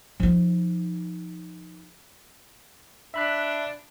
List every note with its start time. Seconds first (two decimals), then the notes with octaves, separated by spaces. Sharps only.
0.20 F3 D#4
3.14 D4 E5 B5 F#6